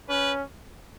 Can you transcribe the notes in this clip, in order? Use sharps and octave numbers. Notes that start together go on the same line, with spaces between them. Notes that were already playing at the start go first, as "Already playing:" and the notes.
C#4 B4